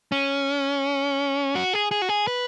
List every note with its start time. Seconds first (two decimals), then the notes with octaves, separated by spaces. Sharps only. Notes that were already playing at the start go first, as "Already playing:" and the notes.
0.12 C#4
1.55 F#4
1.73 G#4
1.91 G#4
2.02 F#4
2.09 G#4
2.27 B4